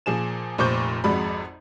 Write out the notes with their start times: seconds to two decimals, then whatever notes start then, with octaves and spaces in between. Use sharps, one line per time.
0.06 A#2 F3 G#4 E7
0.58 F1 A#2 C5 C#6 D6 G6
1.04 G#1 F2 G#3 F#4 D5 B5